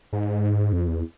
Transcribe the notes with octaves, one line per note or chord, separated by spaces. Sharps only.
G#2
F2
E2